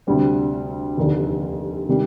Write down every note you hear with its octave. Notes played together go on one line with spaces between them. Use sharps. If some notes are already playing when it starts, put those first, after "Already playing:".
D2 C3 G3 D4
F1 D#2 D3
C3 D#3 G3